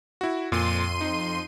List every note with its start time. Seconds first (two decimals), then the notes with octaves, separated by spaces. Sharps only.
0.21 E4 F#4
0.52 F2 A#2 C6 D#7
1.01 D#4